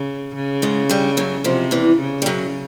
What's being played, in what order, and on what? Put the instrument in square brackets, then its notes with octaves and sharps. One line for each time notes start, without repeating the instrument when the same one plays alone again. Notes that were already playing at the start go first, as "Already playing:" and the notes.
Already playing: [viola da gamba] C#3
C#3
[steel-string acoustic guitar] G#2 G#3
G2 G3
F#2 F#3
[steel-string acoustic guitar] F2 F3 [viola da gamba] C3
[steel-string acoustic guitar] E2 E3
[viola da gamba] C#3
[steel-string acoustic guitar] G3
F#2 F#3